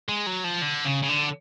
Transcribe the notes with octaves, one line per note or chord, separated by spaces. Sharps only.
G#3
F#3
F3
D3
C#3
C#3
D3